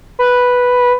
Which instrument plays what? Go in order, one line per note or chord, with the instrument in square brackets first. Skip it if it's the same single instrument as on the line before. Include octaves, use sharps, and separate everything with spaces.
[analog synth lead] B4